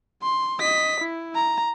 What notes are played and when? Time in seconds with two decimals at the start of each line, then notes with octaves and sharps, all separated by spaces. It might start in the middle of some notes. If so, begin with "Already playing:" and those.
0.22 C6
0.60 D#5 B6
1.00 E4
1.35 A#5